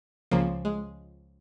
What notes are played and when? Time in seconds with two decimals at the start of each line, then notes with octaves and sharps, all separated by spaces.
0.31 C#2 C#3 F3 A#3
0.65 G#3